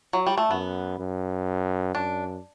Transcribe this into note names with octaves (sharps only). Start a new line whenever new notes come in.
F#3
G3
A3
F#2 B3
F#2
F#2 D4